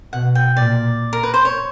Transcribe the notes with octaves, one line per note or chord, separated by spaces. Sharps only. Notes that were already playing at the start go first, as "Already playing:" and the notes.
B2 F#5
G5
A#2 D5
A#4
B4
C5
C#5